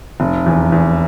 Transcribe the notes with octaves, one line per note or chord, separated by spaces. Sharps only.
F1
E2
E2